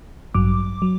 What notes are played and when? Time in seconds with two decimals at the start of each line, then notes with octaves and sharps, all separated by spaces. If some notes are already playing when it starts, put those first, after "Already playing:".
0.34 A1 G2 F#3 D6
0.82 F#3